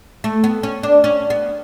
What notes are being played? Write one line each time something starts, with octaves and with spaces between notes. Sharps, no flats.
A3
B3
C#4
D4
C#4
B3